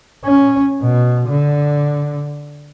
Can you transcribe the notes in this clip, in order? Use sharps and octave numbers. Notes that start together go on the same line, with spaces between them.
C#4
B2
D3